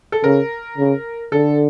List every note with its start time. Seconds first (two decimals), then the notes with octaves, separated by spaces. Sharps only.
0.12 A4
0.24 C#3 A#4
0.77 C#3
1.32 D3 A4